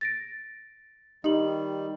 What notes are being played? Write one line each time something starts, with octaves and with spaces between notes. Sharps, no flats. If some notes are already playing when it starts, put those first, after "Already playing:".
A6 A#6 D7
D#3 G3 D#4 G4 F#7